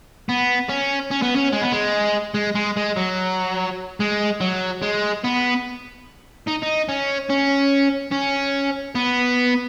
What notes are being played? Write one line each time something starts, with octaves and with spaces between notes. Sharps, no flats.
B3
C#4
C#4
B3
C#4
G#3
B3
G#3
G#3
G#3
G#3
F#3
G#3
F#3
G#3
B3
D#4
D#4
C#4
C#4
C#4
B3